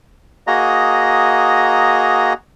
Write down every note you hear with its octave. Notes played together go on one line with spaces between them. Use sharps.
A#3 F#4 G#4 D#5 A#5